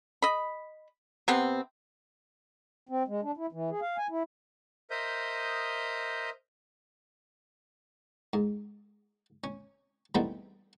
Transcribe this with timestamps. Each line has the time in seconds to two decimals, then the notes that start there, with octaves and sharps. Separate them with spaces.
0.22 D#5 B5
1.28 C3 B3 C4
2.89 C4
3.08 G#3
3.23 D4
3.37 E4
3.52 E3
3.70 G#4
3.81 F5
3.98 G#5
4.09 E4
4.91 A#4 C5 D#5 E5 D#6 G6
8.33 G#2
9.44 C#4
10.15 E3 G3 A3 B3 C4 D#4